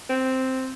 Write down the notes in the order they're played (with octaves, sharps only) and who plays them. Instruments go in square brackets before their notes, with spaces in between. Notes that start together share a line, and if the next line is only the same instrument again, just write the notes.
[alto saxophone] C4